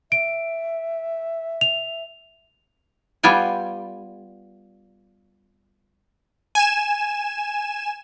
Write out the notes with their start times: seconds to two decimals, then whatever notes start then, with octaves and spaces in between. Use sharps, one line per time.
0.12 E5 D7
1.61 F7
3.23 G3 B3 F4 G5 G#5
6.55 G#5 E7